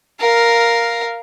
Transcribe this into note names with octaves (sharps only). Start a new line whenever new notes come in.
A#4 F5